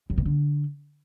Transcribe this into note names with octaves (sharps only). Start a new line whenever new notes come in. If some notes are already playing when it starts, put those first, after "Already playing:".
F#2
B2
D3